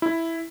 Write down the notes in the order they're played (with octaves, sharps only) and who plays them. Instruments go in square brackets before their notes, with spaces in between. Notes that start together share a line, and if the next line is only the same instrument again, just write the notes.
[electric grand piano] E4